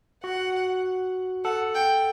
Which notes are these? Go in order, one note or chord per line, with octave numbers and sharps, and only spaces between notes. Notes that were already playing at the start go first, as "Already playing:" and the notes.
F#4 F#5
A4 F#5
G5